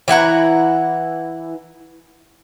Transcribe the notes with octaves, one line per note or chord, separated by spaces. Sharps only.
E3 E4 F#5 A#5